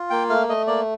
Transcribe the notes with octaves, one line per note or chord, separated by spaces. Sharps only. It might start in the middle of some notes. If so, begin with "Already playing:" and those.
Already playing: F4
A#3 G5
A3 F5
A3 D#5
A#3 D5